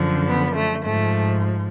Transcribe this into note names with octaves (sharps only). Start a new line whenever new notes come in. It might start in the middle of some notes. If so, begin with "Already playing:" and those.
Already playing: F#2 D3 F3
B3
A3
G#2 F3 A3